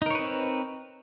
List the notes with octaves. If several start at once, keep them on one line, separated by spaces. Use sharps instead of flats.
C4 D#4 A#4 B4 C#5